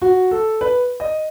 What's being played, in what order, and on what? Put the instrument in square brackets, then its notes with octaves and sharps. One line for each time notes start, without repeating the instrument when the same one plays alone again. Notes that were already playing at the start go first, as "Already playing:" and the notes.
[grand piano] F#4
A4
B4
D#5